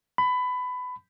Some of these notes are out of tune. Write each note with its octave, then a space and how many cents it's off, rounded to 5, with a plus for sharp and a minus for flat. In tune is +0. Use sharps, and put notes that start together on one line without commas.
B5 +20